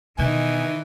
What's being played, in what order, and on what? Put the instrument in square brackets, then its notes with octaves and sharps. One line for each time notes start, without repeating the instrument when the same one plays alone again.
[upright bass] B2 [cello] D#3 D#4 [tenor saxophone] E3 [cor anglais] G#5